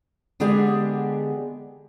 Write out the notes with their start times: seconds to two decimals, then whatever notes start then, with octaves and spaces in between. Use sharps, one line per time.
0.40 D3 G#3 B3 D4 G4 G#4